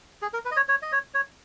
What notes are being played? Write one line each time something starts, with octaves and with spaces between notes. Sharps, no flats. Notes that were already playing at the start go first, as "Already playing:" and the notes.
G#4
A#4
B4
D#5
C#5
C#5
D#5
C#5
C#5